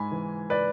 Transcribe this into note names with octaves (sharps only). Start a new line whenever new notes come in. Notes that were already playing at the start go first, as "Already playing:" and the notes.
Already playing: G#2 G#5 B5
E3
B4 D5